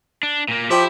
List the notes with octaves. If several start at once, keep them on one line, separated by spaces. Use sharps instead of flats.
D4
A#2 A#3
F3 E4 G4